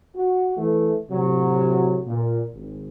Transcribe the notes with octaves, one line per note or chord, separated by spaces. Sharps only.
F#4
E3 A3
A2 C3 F#3
A#2
G#1